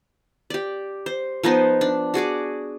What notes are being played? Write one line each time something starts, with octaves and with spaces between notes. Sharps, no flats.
G4 D5
C5
F3 B3 D#4 C5
D4
F#4 G#4 D5 D6